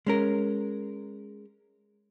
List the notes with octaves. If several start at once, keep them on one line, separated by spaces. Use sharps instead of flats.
G#3 C#4 A#4